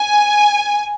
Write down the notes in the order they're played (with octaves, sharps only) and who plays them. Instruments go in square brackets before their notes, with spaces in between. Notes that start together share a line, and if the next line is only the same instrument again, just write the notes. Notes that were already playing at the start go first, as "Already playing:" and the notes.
Already playing: [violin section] G#5